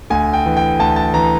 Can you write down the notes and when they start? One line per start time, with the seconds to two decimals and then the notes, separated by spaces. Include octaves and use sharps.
0.10 D2 G#5
0.33 G5
0.46 E3
0.57 G5
0.79 D2 A5
0.96 A5
1.14 E3 A#5